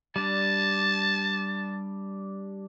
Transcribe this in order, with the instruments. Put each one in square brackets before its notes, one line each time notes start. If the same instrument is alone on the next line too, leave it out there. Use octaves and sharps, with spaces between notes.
[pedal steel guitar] G3 D4 [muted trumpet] A5